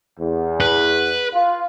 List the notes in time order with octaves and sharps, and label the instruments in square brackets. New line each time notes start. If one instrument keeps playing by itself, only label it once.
[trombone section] E2
[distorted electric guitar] B4
[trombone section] F4